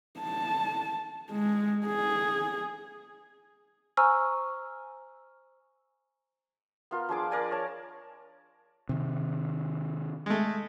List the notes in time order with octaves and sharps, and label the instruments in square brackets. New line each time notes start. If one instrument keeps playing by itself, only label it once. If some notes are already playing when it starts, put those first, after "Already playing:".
[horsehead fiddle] A5
G#3
G#4
[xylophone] C5 G#5 A#5 C#6 E6 F6
[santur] B3 F4 A#4
F3 D4 G#4 D6
A#4 D5 G#5
C#5 A5
[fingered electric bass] C3 D#3
[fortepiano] G#3 A3